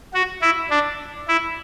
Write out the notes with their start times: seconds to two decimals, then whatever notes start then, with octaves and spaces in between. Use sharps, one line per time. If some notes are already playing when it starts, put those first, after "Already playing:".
0.14 F#4
0.42 E4
0.70 D4
1.28 E4